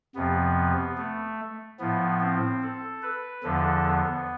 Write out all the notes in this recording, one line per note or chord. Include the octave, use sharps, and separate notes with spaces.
F2 C3 F3 B3
A3
A2 F3 B3
C4
A4
B4
E2 D3 F3 A4
B3